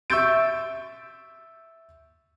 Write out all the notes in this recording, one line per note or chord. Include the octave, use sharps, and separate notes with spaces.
E5 C#6 E6 G6 A6 D7